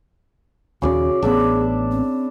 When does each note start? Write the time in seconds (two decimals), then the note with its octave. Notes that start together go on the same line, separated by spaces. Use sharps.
0.82 D#1 D#2 C#3 C#4 F#4 D5
1.22 A1 B3 D4 G#4 E5 B5
1.91 C4